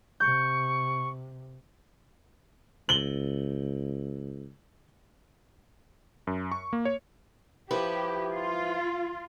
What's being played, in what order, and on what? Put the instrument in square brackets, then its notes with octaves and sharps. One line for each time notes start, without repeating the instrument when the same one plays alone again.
[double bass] C3 [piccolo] C#6 [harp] G6
[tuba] C#2 [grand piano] F#7 G7
[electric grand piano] F#2
C#6
A#3
C#5
[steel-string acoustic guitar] F3 E4 B4 [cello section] G4
[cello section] F4